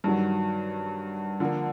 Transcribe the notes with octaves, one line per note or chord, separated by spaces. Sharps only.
G2 D#3 F#3
D3 F3 A#3